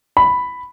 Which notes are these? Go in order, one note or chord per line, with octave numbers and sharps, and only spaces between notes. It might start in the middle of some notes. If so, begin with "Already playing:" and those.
B5